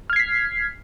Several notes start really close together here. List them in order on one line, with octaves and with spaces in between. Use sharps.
F6 G#6 C7 B6